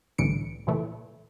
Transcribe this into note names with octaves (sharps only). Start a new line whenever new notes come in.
C2 A2 D3 E3 C#7 D7
A#2 C#3 E3 A3